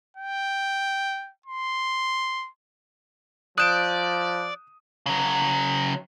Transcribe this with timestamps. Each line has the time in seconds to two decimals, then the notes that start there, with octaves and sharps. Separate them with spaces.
0.17 G5
1.46 C6
3.58 F3 D5 D#6 F#6 G6 D7 E7
5.06 C#3 F#3